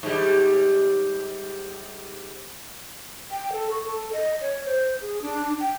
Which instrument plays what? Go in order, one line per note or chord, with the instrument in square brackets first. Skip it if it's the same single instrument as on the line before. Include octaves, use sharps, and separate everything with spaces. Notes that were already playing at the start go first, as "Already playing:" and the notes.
[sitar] G#2 G3
[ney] G5
A4
C#6
A4
D#5
C#5
C5
G#4
D4
G5